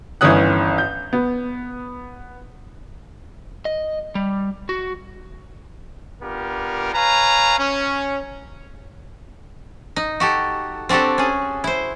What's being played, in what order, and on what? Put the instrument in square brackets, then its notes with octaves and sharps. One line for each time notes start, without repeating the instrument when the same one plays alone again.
[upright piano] G1 D#3 E3 C#4 D#6 F#6
G6
B3
[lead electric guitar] D#5
G3
F#4
[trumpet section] B3 D4 F4 G4 A#4
B4 C#5 F5 G#5 A#5
C#4
[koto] D#4
F#4 G4 A4
C4 D4 F#4 G4 A4
C#4 G#4
E4 C5